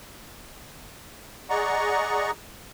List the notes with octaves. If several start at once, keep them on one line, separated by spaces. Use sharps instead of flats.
G#4 D5 D#5 F#5 A#5 C#6